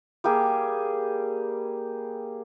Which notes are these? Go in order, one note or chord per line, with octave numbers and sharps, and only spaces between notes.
G3 A#3 G4 G#4